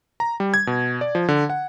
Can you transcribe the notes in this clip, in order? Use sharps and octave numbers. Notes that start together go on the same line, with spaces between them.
A#5
G3
G#6
B2
D5
F3
D3
F#5